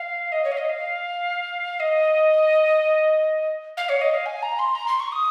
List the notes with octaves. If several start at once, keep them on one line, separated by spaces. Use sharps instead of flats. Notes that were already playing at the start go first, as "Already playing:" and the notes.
Already playing: F5
D#5
C#5
F5
D#5
F5
D#5
F5
C#5
D#5
F5
G#5
A#5
C6
A#5
C6
C#6
D#6